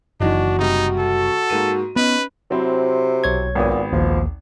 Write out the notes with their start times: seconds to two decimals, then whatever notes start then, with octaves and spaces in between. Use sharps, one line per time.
0.20 F#1 D#3 E3 D4 D#4 F#4
0.59 C3 G3 D#4
0.99 A4
1.50 G#2 A#3 D#7
1.96 B3 C#4 D#4 B4
2.51 C3 F#3 C4 E4
3.24 B1 C#5 G#6
3.55 G#1 A#2 B3 D#6
3.93 A#1 D#2 F3